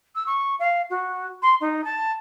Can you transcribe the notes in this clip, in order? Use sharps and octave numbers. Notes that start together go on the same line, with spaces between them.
E6
C#6
F5
F#4
C6
D#4
A5